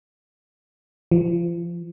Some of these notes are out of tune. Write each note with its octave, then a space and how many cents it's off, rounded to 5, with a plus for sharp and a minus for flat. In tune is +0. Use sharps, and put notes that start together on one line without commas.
F3 -35